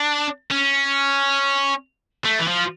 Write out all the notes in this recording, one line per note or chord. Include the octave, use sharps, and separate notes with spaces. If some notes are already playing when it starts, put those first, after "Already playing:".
Already playing: D4
C#4
A3
E3
F3